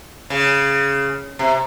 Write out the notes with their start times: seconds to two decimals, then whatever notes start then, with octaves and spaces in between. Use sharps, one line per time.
0.30 C#3
1.39 C3